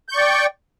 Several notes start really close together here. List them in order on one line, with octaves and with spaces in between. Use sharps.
G6 C#6 D5 G5